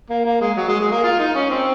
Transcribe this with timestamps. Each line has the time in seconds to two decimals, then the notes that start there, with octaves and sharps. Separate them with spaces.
0.10 A#3
0.25 A#3
0.41 G#3
0.57 F#3
0.68 G#3
0.80 G#3
0.92 A#3
1.04 F4
1.19 D#4
1.35 C#4
1.50 C4